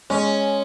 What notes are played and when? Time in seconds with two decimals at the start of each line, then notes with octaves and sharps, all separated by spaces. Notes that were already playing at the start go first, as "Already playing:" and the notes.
0.10 G#3 C#4